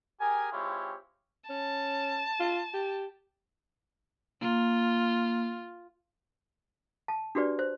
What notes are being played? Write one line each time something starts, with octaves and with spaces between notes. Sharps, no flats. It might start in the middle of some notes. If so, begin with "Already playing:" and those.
G4 G#4 A#4 G#5
G#3 C4 E4 F4 G4 C#5
C#4 A5
F4
G4
A#3 F4
A5
D4 F#4 G4 B4 D5
C5